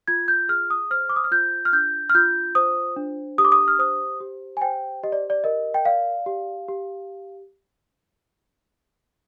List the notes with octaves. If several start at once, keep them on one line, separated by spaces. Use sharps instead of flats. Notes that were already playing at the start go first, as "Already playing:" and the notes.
F4 G#6
G6
G#4 F6
D#6
C5 F6
D6
D#6
F6
F4 G6
F6
D4 G6
F6
F4 G6
C5 D#6
D4
G4 D#6
D6
D#6
F6
C5 D#6
G4
G#5
C5 G5
G4 D#5
D5
D5
A#4 D#5
G5
D5 F5
G4
G4